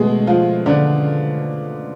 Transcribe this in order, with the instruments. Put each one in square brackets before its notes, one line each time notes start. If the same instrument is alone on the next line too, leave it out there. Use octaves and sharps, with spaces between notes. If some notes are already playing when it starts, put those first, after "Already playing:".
Already playing: [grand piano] B2 A3 [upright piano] G#3 B3 G#4
[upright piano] F3 F4
D3 D4